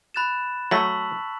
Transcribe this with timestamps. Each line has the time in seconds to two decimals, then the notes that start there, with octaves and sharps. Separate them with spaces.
0.14 B5 F#6 A6 E7
0.71 F#3 A3 A5 C#6 E6 B6 F#7